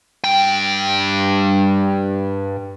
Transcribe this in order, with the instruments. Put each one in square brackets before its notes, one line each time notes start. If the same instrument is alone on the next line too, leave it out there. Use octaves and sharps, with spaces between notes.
[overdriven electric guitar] G2 G5